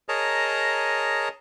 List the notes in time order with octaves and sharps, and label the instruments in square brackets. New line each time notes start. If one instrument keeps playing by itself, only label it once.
[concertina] G#4 A#4 C#5 D#5 A5 A#5